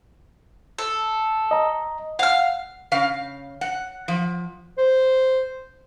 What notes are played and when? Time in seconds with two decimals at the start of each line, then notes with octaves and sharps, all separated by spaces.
0.78 A4
1.51 D#5 A#5
2.19 F5 F#5 F6
2.92 C#3 F5
3.61 F#5
4.08 F3
4.78 C5